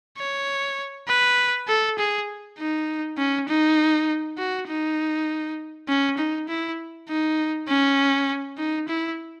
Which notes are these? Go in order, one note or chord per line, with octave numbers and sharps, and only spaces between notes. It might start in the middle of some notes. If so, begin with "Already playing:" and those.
C#5
B4
A4
G#4
D#4
C#4
D#4
F#4
D#4
C#4
D#4
E4
D#4
C#4
D#4
E4